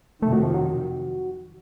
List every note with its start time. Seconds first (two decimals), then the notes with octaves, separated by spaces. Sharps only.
0.22 F2 C3 D#3 A3
0.32 F#3
0.43 F3
0.54 F#3